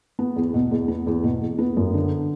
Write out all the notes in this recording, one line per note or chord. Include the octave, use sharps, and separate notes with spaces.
B3
E2
B2
E2
B3
E2
B2
E2
B3
F#2
D3